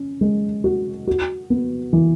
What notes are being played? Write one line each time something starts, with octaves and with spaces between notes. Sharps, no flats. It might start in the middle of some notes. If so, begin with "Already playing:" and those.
Already playing: C#4
G#3
F#4
F#4
B3
E3